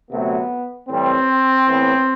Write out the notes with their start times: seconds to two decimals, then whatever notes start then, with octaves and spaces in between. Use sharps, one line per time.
0.11 D2 C3 F#3 A3 B3
0.89 A2 E3 G3 C4
1.67 A2 E3 B3